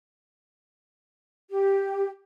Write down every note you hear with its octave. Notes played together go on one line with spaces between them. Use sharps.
G4